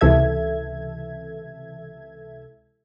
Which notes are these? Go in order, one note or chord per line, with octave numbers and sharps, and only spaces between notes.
C#2 C3 E3 A4 E5 G#6